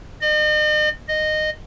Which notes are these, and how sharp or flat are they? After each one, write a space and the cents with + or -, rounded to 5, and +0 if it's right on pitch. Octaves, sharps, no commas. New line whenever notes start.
D#5 -40
D#5 -15